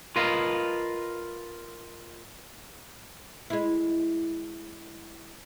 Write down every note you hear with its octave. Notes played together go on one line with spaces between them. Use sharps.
F4 A#4 B4 D#5 F5
G#3 E4